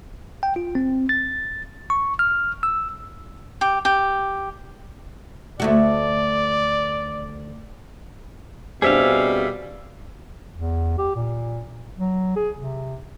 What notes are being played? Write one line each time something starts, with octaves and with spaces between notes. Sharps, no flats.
G5
F4
C4
A6
C#6
F6
E6
G4
G4
D2 A3 F#4 D5
B2 G3 C4 D4 G#4 E5 F5
E2
G4
A#2
F#3
G#4
C3